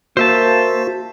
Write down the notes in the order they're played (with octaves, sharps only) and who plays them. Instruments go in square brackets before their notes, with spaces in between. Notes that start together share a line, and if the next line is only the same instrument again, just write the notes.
[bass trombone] A#3 [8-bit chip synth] F#4 [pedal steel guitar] C5 E5 A5